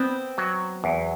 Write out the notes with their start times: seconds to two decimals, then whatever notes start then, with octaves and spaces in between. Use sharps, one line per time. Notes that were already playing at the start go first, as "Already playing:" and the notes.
Already playing: B3 C4
0.38 F#3
0.84 E2